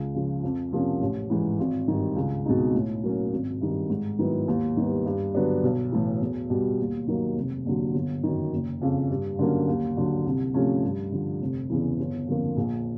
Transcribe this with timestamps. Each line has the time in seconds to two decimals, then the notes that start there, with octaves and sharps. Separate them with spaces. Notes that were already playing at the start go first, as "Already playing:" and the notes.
Already playing: C#2
0.15 C#3 F3
0.43 F2
0.72 C3 F3 A#3 C#4
1.01 A1
1.30 G#2 E3
1.59 G#1
1.88 G2 D#3
2.16 C#2
2.45 B2 G#3 C4 D#4
2.74 A2
3.03 F#3 A#3 C#4
3.33 G#1
3.61 G2 D#3
3.90 G#2
4.19 D#3 F#3 B3 E4
4.48 D#2
4.77 D#3 G3 B3
5.06 G2
5.34 D3 F#3 B3 D4
5.63 B1
5.92 A2 E3
6.21 E2
6.50 B2 G3
6.79 D#2
7.08 D#3 F#3 A#3
7.37 F1
7.65 D#2 D3 F#3
7.94 G1
8.23 F#2 D#3
8.52 F#1
8.82 F2 C#3
9.10 G2
9.39 D3 F#3 A#3 C#4
9.68 D#2
9.97 D3 F#3
10.26 C2
10.54 C3 F3 A3 C#4
10.83 G2
11.12 D3 F3
11.41 F1
11.70 E2 C#3 E3
11.99 G1
12.28 F2 D3 F3 A#3
12.57 A#1